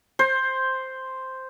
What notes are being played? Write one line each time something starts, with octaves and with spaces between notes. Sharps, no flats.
C5